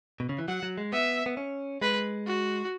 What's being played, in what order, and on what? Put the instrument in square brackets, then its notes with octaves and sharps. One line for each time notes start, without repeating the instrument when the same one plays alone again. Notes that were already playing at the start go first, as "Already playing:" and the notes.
[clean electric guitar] B2
C#3
E3
[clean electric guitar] F#3 [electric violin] F#5
[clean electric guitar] F#3
G#3
[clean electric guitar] B3 [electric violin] E5
[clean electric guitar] B3
C#4
[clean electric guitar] G#3 [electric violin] B4
[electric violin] F#4